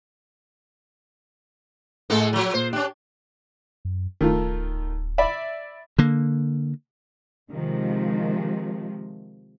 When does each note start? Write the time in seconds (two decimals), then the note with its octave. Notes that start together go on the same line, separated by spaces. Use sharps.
2.10 A2 G#3 A#3 E4 G#4 A4
2.33 F3 F#3
2.54 A#2 C5
2.73 C#4 D4 G4
3.85 F#2
4.21 D1 D#3 A3 F4
5.18 D5 E5 B5
5.99 D3 A#3
7.51 C3 D#3 F3 G#3